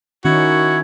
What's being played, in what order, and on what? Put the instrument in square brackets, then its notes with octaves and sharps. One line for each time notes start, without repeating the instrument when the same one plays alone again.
[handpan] D#3 C#4 D#4 [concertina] E4 C#5 [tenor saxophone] F#4